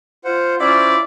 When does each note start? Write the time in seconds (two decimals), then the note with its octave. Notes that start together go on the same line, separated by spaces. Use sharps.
0.24 F4 C5 F#5
0.61 C#4 E4 F4 C5 D5